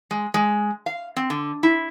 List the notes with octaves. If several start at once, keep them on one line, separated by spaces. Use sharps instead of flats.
G#3
G#3
F5
C4
D3
E4